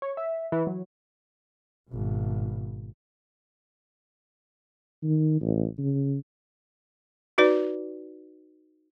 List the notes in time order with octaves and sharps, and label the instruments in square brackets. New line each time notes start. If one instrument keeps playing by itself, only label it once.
[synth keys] C#5
E5
E3
F#3
[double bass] G#1 B2
[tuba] D#3
A1
C#3
[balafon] D#4 F#4 B4 D5